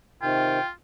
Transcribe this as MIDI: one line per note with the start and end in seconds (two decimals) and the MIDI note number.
0.22 0.59 48
0.22 0.59 51
0.22 0.70 65
0.22 0.67 79